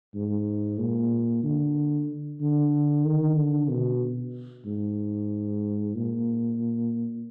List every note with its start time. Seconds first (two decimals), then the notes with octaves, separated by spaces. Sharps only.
0.15 G#2
0.79 A#2
1.44 D3
2.41 D3
3.06 D#3
3.37 D3
3.70 B2
4.66 G#2
5.95 A#2